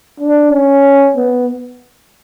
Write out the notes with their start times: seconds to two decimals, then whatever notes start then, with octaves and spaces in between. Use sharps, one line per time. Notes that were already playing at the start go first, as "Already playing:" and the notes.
0.20 D4
0.52 C#4
1.17 B3